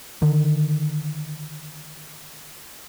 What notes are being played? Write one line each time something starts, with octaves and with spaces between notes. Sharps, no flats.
D3 D#3